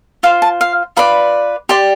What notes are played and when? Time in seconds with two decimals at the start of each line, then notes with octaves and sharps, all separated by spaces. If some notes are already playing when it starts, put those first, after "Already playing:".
0.23 F4 C5 F5
0.42 A5
0.61 F5
0.96 F4 B4 D5 B5
1.69 G4 D5 C6